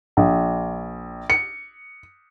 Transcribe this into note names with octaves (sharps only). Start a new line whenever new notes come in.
A#1
C#7